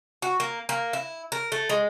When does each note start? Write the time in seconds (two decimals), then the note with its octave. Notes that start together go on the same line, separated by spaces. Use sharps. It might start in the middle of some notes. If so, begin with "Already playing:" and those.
0.22 F#4
0.40 A#3
0.69 A#3
0.93 E4
1.32 A#4
1.52 A3
1.69 G#3